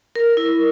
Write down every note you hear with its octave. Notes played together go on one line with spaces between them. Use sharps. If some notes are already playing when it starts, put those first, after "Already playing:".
A#4
E4